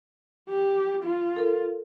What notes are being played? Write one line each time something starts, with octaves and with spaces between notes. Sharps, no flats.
G4
F4
A4 A#4